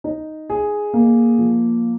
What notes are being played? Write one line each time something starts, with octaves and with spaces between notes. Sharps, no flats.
D#4
G#4
A#3
F3